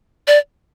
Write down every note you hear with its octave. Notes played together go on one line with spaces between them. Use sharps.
D5